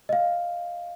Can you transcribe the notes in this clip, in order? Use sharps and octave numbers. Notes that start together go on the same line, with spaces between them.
D#5 F5